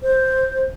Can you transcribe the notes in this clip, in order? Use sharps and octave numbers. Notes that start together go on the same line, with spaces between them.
C5